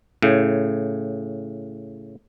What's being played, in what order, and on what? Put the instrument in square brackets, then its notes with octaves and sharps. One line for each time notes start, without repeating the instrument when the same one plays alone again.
[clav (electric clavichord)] A2 C#3